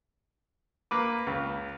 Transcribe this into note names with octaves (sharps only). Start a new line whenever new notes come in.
A#3 B4 D6
C#2